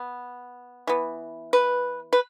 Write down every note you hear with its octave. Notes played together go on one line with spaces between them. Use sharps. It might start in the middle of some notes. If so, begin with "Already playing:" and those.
Already playing: B3
E3 B3
B4
B4